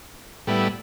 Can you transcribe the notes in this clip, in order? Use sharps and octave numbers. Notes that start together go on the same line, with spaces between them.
A2 G3 B3 E4